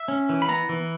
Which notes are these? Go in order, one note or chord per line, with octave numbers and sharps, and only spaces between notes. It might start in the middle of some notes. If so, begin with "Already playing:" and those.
Already playing: E5
C#4
E3
B5
B3 A#5
E3